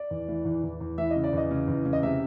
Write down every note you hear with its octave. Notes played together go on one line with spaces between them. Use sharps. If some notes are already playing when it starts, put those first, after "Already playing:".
Already playing: D5
E2
E3
E2
E2
E2
E3 E5
C#3 D#5
D5
E2 D#5
C#3
E2
C#3
D#5
C3 E5